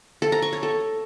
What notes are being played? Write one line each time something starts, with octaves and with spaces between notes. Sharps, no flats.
A4
A#5
C#6
C#5
A4